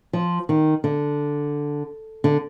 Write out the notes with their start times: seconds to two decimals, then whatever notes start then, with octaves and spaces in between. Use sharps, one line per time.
0.13 F3
0.49 D#3
0.84 D3
2.24 D3